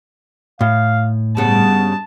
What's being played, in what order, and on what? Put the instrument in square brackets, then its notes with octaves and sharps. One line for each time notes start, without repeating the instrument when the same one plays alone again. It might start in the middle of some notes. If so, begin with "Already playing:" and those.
[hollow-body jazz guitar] A2 [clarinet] F5
[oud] G2 C#3 [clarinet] B3 [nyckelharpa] A5